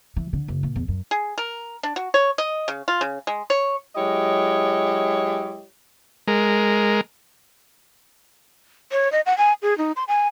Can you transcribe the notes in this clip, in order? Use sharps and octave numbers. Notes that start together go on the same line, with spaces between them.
E3
D3
F#1
A#2
E2
F#2
G#4
A#4
D4
F#4
C#5
D#5
C#3
F4
C#3
G#3
C#5
F#3 G#3 E4 G4 C#5 D#5
G#3 A#4
C#5
D#5
F#5
G#5
G#4
D#4
C6
G#5